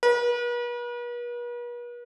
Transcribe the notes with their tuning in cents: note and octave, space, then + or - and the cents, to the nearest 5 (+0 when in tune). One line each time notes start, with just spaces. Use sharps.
B4 -45